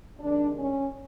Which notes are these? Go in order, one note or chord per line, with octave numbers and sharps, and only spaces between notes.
C3 D#3 G#3 D4
C#4